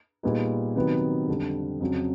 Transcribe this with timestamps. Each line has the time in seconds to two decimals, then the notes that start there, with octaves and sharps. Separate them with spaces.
0.23 A#2 G3 B3 D#4 G#4
0.76 C3 D#3 F#3 B3
1.28 F2 D3 G3
1.80 F2 C#3 F#3